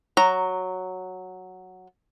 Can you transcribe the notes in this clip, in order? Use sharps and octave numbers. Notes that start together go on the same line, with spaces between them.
F#3 A#5